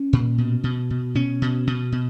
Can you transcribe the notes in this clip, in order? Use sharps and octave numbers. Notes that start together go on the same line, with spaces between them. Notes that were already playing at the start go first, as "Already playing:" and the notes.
Already playing: C#4
A#2
B2
B2
B2
B2 C#4
B2
B2
B2